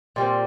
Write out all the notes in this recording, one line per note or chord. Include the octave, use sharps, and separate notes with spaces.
A#2 G3 C4